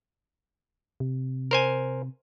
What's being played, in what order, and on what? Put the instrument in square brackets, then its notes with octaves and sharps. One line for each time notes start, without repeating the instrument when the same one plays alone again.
[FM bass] C3
[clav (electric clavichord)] A#4 C5 G#5